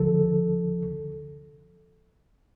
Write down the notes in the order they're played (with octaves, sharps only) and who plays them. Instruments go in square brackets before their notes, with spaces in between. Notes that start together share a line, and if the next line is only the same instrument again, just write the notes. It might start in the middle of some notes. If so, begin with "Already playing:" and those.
Already playing: [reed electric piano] D2 D3 F3 A4